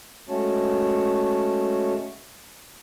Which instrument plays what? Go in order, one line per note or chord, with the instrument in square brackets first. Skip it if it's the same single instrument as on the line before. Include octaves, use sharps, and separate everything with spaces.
[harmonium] G#3 A3 C#4 F#4 C#5 A5